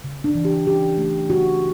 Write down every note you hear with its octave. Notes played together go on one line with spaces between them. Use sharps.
C#3
D4
E3
G4
C#4 G4
A3
C#3 F#4